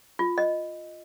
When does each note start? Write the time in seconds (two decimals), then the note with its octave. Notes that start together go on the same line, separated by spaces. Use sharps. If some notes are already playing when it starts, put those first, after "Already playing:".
0.19 F4
0.38 D#5